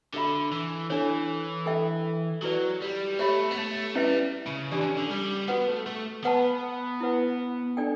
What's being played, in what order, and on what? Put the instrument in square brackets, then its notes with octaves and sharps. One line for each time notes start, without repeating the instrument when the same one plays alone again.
[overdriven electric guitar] D3 [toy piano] F#4 A4 E5 B5
[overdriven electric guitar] E3
[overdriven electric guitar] E3 [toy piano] D4 A4 C#5
[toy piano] A4 E5 G5
[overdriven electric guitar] F#3 [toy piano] E4 B4 D5
[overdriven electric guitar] G3
[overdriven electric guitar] A3 [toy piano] G4 C#5 E5 B5
[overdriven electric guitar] B3
A3
[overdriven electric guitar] G3 [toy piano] C#4 E4 B4 E5
[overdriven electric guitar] C#3
[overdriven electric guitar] E3 [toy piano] D4 G4 D5
[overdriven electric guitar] D3
C#3
D3
G3
[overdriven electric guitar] B3 [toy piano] F#4 B4 F#5
[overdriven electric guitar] A3
A3
[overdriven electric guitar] B3 [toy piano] B4 F#5 A5
[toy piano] E4 B4 F#5
D4 A4 D5 G5